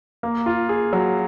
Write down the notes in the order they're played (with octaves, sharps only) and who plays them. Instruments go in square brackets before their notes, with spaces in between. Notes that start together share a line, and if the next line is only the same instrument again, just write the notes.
[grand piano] A#3
F4
G#4
F#3